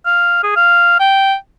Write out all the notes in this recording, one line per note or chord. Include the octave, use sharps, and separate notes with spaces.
F5
G#4
F5
G5